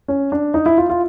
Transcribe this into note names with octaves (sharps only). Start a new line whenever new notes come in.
C#4
D4
D#4
E4
F4
F4